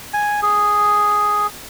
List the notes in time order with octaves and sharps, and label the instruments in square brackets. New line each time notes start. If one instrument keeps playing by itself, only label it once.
[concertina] G#5
G#4